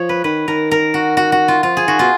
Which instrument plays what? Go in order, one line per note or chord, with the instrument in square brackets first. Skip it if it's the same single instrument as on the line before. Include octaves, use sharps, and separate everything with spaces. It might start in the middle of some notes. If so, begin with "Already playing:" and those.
Already playing: [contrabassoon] F3 [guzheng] C#5
[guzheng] B4
[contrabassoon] D#3 [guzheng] B4
[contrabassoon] D#3 [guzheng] A#4
[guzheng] A#4
F#4
F#4
F#4
F4
[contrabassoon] F3 [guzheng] F4
[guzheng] G#4
[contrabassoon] D#3 [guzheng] F#4
[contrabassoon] B2 [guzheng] F4